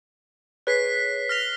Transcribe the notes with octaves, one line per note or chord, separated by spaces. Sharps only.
G#4 B4 C#5 F#6 B6 C7
F6 A#6 F7